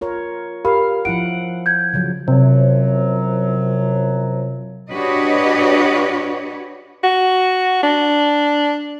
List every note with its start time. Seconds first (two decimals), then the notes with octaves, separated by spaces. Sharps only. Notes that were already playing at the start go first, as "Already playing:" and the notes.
0.01 F4 A#4 C#5
0.65 G4 A#4 F5 B5
1.05 F3 E4 F#5 D7
1.66 G6 G#6
1.93 C#3 F3 F#3
2.28 F#2 C3 F3 F#3
4.91 D4 F#4 G4 B4 C#5 D#5
7.04 F#4
7.83 D4